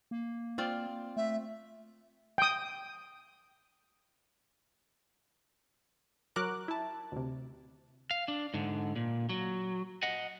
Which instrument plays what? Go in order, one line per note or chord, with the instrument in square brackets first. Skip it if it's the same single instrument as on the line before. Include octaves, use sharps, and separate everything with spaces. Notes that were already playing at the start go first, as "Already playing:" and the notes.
[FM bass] A#3
[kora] C4 F4 D5
[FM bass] A3 [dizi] E5
[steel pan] G5 D#6
[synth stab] F#3 F#4 A#4 D6 F#6
E4 A5
D2 C3
[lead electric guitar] F5
D4
G#2 D3
A#2
F#3
D#5 F#5